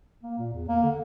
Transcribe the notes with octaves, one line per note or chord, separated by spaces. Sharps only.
A#3
A#2
E2
A#3
D3